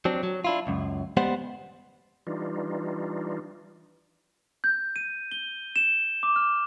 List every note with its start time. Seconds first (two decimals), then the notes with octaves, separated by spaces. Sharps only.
0.05 F#3 C4 D4
0.23 F#3
0.45 D4 E4 F4
0.67 C#2 F#2
1.17 G3 G#3 B3 G4 C5 F#5
2.27 E3 G3 D4 D#4 F4
4.64 G6
4.96 D#7
5.32 G7
5.76 E7
6.23 D6
6.36 F6